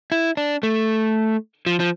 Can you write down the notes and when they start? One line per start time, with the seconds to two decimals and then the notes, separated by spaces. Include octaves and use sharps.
0.12 E4
0.37 D4
0.63 A3
1.66 F3
1.80 F3